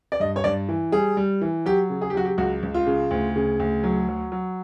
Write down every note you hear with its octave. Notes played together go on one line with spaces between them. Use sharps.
D5
G2 D#5
C#5
G2 D5
E3
G3 G#4
G3
E3
F#3 G4
C#3
G#4
G4
F#3 F#4
G4
C#2 F#4
C#2
F4
C#3
D2
C#3
D2
F#3
F#3
F#3